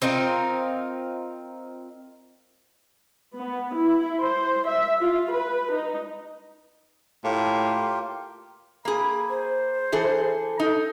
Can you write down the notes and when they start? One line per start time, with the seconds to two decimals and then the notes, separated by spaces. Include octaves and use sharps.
0.02 C4 D#4 F4 A#4
3.35 B3
3.75 E4
4.20 C5
4.67 E5
5.00 F4
5.32 B4
5.72 D#4
7.24 A2 A#3 F4 G4
8.85 A#3 G#4 B5
9.30 C5
9.92 E3 G#4 A4
10.60 D#4 A4